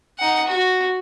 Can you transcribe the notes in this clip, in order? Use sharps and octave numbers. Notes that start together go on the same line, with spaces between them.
D#4 F#5
F#4